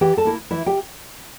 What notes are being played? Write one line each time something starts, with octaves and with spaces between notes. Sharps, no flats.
E3 G4 G5
A4 A5
A#3 E4
E3 E4 E5
G4 G5